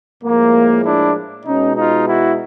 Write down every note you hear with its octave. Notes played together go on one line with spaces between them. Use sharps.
A2 F3 G#3 A#3
D4 E4
B2 G#3 C#4 D#4
D#4 F4
E4 F#4